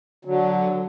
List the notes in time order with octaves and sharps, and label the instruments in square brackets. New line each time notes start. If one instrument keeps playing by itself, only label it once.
[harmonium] D3 F#3